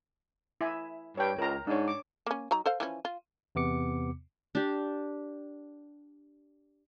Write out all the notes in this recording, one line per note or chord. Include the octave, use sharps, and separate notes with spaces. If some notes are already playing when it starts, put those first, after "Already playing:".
E4 E5 G#5
G2 C#5 G5
C#2 A#4 A#5
G#2 D4 C#5
D6
A#3 C#4
F#3 D#4 A#5
A4 C5 F5
E3 F3 C#4
F4
E2 C3 B3 D6 C#7
D4 G4